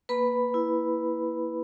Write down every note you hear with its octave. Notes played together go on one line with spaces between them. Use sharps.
A#3 B4 B5
E4